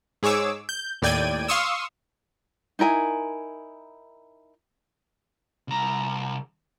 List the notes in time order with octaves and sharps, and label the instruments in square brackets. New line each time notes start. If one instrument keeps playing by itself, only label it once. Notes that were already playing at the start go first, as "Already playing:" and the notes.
[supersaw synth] G#2 G#4 C#5 D6 E6
G6
D#2 A2 D5 G5 G#6 D#7
F5 C6 C#6 D#6 E6
[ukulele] D#4 E4 A#4 G#5
[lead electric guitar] C2 A#5